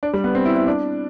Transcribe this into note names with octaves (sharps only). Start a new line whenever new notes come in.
D4
G3
B3
C4
E4
E4
D4